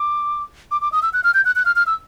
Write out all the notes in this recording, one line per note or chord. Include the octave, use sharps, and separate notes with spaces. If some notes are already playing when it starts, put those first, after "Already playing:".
Already playing: D6
D6
D6
D#6
E6
F#6
F6
G6
F#6
F#6
F6
F6
E6